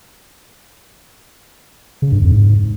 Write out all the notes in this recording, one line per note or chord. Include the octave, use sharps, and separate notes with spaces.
C#3
G2
F2
G#2